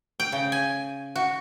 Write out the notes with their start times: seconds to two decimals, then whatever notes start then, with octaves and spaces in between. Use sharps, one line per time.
0.20 G5
0.32 C#3
0.52 G#5
1.16 F#4